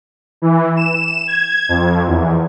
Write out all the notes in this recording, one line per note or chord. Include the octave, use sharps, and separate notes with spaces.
E3
E7
G#6
F2
E2